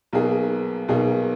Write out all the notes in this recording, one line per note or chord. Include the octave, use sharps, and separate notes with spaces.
B1 B2 A#3 D#4 G#4
B1 B2 A#3 D#4 G#4